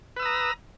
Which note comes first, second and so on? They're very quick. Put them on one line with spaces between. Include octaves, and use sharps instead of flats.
B4 E6 D#6 A#5